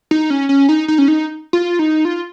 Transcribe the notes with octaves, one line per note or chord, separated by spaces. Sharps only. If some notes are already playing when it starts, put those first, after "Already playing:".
D#4
C#4
C#4
D#4
D#4
C#4
D#4
F4
D#4
F4